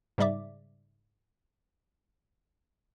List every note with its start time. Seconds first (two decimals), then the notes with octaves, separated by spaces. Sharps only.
0.18 G#2 C#3 G3 D5 E5 D6